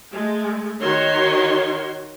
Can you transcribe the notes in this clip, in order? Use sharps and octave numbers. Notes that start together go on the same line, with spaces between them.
G#3 A3
D#3 F#4 C#5 C6